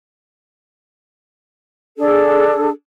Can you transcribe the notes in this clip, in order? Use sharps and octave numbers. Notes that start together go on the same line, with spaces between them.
D4 G#4 A4